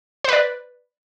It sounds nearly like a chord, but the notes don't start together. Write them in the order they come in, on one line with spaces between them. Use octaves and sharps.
C5 B4 D5